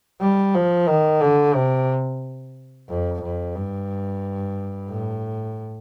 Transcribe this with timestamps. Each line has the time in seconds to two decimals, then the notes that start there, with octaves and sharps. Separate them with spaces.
0.21 G3
0.55 F3
0.88 D#3
1.21 D3
1.56 C3
2.89 F2
3.22 F2
3.56 G2
4.90 A2